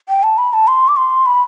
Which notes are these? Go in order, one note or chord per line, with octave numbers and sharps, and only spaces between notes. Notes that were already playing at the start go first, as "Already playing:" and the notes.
G5
A5
B5
A5
C6
D6
C6
B5